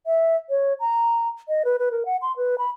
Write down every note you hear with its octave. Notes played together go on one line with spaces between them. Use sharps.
E5
C#5
A#5
D#5
B4
B4
A#4
F#5
C6
B4
B5